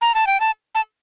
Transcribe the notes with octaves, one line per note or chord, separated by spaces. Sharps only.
A#5
A5
G5
A5
A5